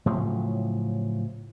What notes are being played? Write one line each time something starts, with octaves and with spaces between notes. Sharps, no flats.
A2 C#3 F3 F#3